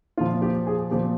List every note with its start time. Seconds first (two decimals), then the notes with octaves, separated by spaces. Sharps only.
0.18 A#2 F3 F4
0.42 G4
0.67 G#4
0.91 A#2 F3 G4